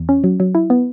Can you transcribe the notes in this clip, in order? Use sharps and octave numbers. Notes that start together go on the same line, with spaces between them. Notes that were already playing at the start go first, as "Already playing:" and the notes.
Already playing: E2
C#4
F#3
F#3
E4
B3